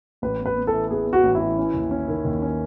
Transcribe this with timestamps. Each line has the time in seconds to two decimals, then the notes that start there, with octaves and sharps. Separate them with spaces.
0.22 A1 B4
0.40 B3
0.46 B4
0.57 B3
0.67 A4
0.73 E3
0.90 B3 G#4
1.07 B3
1.13 F#4
1.23 A1
1.35 E4
1.40 E3
1.58 C#4
1.74 D#2
1.91 C#4
2.08 D#3
2.25 D#2
2.42 C#4